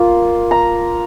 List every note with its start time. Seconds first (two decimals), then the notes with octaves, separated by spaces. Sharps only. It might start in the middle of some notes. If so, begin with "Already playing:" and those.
Already playing: A#3 F4
0.51 A#5